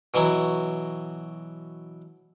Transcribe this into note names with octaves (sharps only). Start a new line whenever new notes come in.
B2 E3 F#3